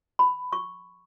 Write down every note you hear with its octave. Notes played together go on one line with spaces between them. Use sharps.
B5
C#6